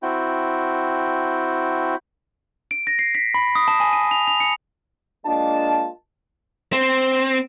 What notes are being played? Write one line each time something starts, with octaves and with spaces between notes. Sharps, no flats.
C4 E4 F#4 G5
D7
A#6
C7
B6
B5
D#6
A5
G#5
D#7
F7
F7
C#7
G#3 A#3 D4 F4 D#5 A5
C4